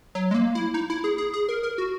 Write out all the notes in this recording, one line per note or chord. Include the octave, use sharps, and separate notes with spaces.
F#3
G#3
A#3
E4
D#4
E4
G#4
G#4
G#4
A#4
A#4
F#4